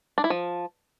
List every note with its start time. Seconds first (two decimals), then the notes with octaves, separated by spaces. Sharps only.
0.18 D4
0.24 E4
0.30 F3